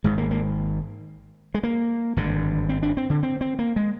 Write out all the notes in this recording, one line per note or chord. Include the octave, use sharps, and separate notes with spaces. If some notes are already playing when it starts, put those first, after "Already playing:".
G#1 G#2 G#3
A#3
A#3
G#3
A#3
G#1 G2 D3
C4
D4
C4
D3
C4
C4
A#3
G#3